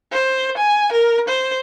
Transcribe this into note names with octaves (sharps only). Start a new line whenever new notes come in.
C5
G#5
A#4
C5